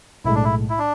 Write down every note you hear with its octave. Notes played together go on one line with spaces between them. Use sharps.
B1 A2 G#3 E4
D4
E4
E4
D4